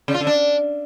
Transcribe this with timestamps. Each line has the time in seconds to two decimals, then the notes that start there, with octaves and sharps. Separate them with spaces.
0.08 C#3
0.14 F4
0.21 D3
0.27 D4